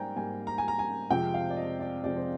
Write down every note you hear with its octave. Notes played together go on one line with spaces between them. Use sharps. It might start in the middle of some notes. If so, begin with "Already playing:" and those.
Already playing: G#2 G3 A#3 C5 D5 G5 G#5 A#5
G#2 G3 A#3 G#5
A#5
G#5
A#5
G#5
F2 C3 F3 G#3 C4 G5
F5
D5
D#5
D5
F2 C3 F3 G#3 C4 D5
C5